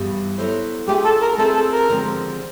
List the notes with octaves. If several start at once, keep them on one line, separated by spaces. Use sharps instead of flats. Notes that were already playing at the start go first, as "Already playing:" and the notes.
Already playing: G2 E3 G3 B3
F#3 B3 E4 A4 C5
A3 D4 F4 G4 G#4
A4
A#4
A3 C4 F4 G#4 A4 B4
A4
A#4
D#2 D3 F3 G#3 C4